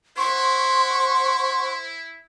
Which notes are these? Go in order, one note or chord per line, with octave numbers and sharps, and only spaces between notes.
E4 C5 F#5 C6 C#6